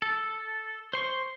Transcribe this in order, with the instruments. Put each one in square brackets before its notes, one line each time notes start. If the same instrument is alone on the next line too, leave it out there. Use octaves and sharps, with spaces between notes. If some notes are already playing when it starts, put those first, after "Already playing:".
[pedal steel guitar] A4
C5 C6 C#6